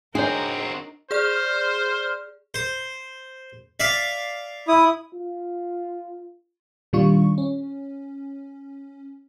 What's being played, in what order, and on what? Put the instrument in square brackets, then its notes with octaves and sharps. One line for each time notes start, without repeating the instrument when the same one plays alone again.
[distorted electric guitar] C4 F#4 [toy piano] D4 C#5 [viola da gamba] D#4 A#4 [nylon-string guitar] G#4
[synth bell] G#4 D5 [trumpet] C5 [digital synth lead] F6
[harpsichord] C5
D5 E5 F5
[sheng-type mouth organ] E4 D#6
[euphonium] F4
[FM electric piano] A#2 D#3 G3 D4 F4 C#6
C#4